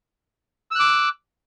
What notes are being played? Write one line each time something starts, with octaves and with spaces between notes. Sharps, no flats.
D6 E6 F#6